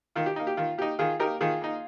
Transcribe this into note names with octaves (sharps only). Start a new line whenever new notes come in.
D#3 F4
G4
A#3 D#4
G4
D#3 F4
A#3 D#4 G4
D#3 F4 G#4
A#3 D#4 G4 A#4
D#3 F4 G#4
A#3 D#4